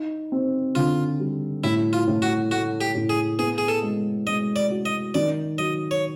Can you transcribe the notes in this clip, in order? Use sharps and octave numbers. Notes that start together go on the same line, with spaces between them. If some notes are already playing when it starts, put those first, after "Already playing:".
Already playing: D#4
C4
D3 F4
G3
A2 E4
F4
A2
F#4
A3 F#4
G4
A2
G#4
B3 G#4
G#4
A4
G#3
G#3 D#5
D5
F#4
D#5
D#3 D5
F#3 D#5
C#5